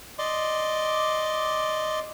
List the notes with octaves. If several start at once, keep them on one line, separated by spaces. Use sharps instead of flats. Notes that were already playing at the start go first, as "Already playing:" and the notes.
D5 D#5 C6 D6